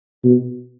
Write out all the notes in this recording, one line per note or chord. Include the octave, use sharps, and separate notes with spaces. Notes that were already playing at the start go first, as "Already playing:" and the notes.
B2